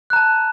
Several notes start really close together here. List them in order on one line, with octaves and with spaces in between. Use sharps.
F#6 A#5 A5